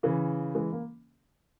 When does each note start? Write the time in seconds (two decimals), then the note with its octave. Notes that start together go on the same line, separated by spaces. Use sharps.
0.03 C#3 E3
0.55 E3 G#3
0.73 A#3